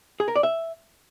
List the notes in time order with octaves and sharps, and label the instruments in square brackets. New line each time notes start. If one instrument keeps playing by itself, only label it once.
[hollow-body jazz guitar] G#4
A#4
D5
E5